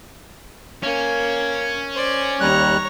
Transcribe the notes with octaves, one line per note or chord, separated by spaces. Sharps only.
A#3 C#4
C5 D5
D#2 G3 C#5 A#5 F#6